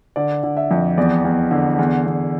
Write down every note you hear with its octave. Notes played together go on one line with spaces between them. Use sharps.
D3 D5
D3
E5
F2
E2 D5
E2
D3
E2
E2